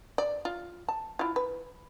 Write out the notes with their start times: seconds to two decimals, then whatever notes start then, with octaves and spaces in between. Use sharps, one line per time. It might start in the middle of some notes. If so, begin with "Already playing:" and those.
0.18 D5
0.45 F4
0.88 A5
1.19 E4 F4
1.36 B4